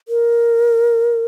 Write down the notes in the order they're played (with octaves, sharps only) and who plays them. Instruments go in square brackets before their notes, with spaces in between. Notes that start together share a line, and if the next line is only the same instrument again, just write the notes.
[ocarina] A#4